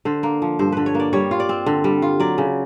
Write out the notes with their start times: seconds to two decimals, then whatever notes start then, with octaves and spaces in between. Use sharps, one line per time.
0.05 D3 C5
0.23 A#3
0.42 F3
0.59 G2 C5
0.72 D3 B4
0.86 C#5
0.95 A#3
1.00 D5
1.13 G3 C#5
1.31 F4
1.40 D5
1.49 C4
1.66 D3
1.84 G3
2.02 F4
2.20 F#3 D5
2.38 C#3